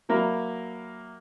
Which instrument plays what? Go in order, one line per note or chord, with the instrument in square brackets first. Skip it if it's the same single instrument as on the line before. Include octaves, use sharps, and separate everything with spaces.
[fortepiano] F#3 A#3 A#4 E5 B5